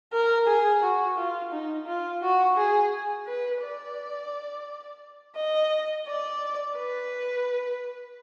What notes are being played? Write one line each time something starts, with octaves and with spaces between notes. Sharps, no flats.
A#4
G#4
F#4
F4
D#4
F4
F#4
G#4
B4
D5
D#5
D5
B4